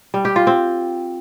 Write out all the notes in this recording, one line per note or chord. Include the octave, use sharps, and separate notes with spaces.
G3
G4
F4
C4